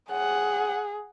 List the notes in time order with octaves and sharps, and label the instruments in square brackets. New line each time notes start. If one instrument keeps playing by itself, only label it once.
[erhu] G#4 [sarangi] F#5